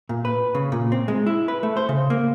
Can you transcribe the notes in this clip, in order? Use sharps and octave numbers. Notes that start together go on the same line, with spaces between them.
A#2
B4
C#3
A#2
C4
G#3
E4
B4
A3
C5
C#3
A#3